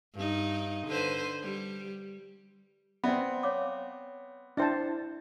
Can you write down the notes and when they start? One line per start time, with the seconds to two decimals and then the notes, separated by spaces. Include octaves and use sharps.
0.15 G2 D#4
0.87 D3 B4 C5
1.42 G3
3.04 B3 C4 D5 E5 B5
3.43 C#5 F5 D6
4.57 D4 E4 C5 E5 G5 A5